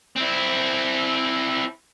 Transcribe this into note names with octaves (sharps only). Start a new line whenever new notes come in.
C4 E4